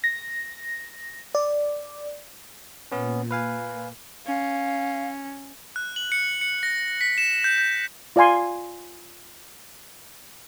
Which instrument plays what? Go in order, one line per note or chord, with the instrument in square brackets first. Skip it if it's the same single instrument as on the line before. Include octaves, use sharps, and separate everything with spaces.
[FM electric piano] A#6
D5
[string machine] A#2 [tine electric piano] B3 C#4
[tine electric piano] B4 F5 G#5
[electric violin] C#4 [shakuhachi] F5
[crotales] F#6
F#7
C#7
C#7
A#6
B6
E7
G6
G6
[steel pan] F4 D5 F5 G#5 C6